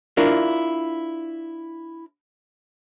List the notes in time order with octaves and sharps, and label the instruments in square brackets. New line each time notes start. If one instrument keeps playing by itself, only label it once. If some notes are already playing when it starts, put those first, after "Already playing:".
[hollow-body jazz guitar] D4 E4 F4 A#4